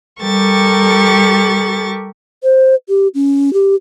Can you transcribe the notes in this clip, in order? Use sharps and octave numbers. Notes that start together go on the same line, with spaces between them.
G3 G4 A4 A#4 C#6 A6
C5
G4
C#4
G4